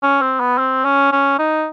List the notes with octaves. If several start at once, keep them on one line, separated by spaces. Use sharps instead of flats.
C#4
C4
B3
C4
C#4
C#4
D#4